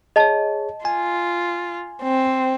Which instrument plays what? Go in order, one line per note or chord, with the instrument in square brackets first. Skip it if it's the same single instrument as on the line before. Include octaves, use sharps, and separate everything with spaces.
[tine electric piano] G#4 C#5 [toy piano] D#5 A5
[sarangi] F4 [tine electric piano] G#5
[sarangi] C4